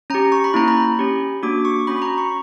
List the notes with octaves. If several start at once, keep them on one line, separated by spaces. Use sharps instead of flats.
C#4 G4 A#5
C#6
B5
A#3 C#4 E4 A#5
B5
C#4 G4
A#3 D4 F#4 D6
C#6
C#4 F#4 B5
A#5
C#6